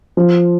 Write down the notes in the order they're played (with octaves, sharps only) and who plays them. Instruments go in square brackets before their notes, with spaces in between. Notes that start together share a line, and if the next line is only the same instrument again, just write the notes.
[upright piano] F3